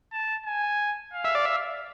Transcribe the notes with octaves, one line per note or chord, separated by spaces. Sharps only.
A5
G#5
F5
E5
D5
E5